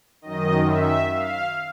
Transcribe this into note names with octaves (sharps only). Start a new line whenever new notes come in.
F#2 D#3 D#5
E5
F5